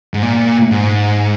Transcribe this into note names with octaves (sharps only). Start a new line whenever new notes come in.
G#2
A#2
G#2